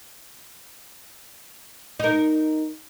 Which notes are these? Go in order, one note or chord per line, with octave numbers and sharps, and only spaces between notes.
D#4 A#4